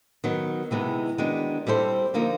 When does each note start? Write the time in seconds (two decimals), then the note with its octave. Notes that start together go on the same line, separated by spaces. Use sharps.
0.24 D#3 F#3 B3
0.71 C3 E3 G#3 B3 D#4
1.18 D#3 G#3 B3 D4 F#4
1.67 G3 C4 E4 A4 C5
2.14 D3 F3 A#3 D#4